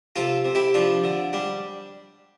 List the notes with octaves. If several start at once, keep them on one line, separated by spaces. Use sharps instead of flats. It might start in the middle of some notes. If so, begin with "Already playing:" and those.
C3 F4 A4
C3
E4 G4
F3 D4 F4
D3
G3 D4